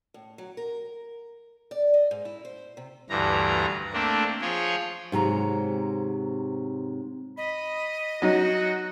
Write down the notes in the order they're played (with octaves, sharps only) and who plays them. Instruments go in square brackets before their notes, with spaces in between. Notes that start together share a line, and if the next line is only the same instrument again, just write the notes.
[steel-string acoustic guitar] A2
F#3
A#4
D5
D#5
G#2
E4
C5
C3
[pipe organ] D2 G2 E3 A#5
A3 A#3 C4 D4
F3 F4 G#4 C#5
[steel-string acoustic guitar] G#2 C3 F#3 A#5
[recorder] D#5 [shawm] B5
[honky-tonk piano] F#3 D#4 [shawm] F#4